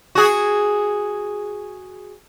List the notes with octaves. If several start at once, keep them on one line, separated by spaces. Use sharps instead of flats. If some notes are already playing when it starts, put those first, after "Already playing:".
F#4 G#4